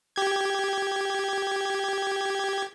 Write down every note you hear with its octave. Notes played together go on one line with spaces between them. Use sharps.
G4 G#6